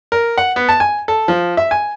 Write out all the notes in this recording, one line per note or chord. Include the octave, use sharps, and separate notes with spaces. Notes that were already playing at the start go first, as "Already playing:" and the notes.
A#4
F#5
B3
A5
G#5
A4
F3
E5
G#5